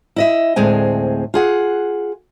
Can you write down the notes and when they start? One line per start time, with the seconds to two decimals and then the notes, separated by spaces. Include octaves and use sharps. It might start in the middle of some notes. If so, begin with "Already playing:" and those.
0.16 E4 D#5 E5
0.56 D2 A2 G#3 C4 G#5
1.34 F4 G#4 F#5